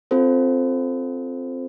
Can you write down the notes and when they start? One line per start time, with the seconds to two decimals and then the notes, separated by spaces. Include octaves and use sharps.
0.11 C4 F4 A4 C5